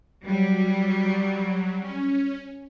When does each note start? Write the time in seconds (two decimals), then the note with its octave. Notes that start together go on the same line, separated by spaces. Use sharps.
0.26 F#3 G3
1.80 C#4